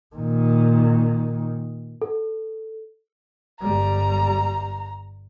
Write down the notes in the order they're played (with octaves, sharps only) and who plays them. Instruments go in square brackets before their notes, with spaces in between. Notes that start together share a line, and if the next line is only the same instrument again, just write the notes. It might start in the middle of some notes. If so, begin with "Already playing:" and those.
[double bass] A#2 D#3
[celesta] A4
[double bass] G1 G3 [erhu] A#5